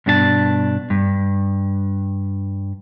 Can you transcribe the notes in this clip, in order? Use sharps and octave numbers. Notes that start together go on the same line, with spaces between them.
G2 B2 D4 F#4 A5
G2